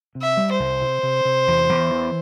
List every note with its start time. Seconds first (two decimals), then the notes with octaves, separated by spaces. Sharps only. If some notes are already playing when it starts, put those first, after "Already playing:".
0.15 C3
0.22 E5
0.37 G3
0.52 C5
0.59 C2
0.81 C3
1.03 C3
1.25 C3
1.48 E2
1.69 E2
1.91 E3